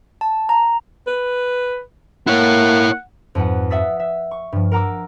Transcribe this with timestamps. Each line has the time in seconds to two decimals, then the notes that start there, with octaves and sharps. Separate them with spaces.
0.21 A5
0.49 A#5
1.07 B4
2.27 A#3 E4 C#5 F#5
3.35 F2 G#2 B4 F#5
3.70 E5 F#5 D#6 E6 A6 B6
4.00 E5
4.31 C#6
4.52 G2 F3
4.71 A#4 F#5 A#5 D6 E6